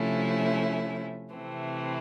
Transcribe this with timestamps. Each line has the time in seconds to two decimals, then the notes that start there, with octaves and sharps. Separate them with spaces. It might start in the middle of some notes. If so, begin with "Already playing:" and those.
Already playing: C3 F3 A3 C#4 E4
1.33 C3 E3 A3 C4